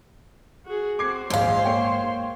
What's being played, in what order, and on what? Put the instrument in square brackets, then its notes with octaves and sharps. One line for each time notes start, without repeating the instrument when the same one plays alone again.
[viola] F#4 G#4
[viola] C4 F#4 [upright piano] D6 G#6 C7
[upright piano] D#1 A#1 [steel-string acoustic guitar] G#2 F5 [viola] C5 C6
[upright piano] A#3 C#5 G5